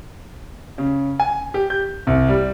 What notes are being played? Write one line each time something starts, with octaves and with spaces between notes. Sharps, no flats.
C#3
G#5
G4
G6
C2
G3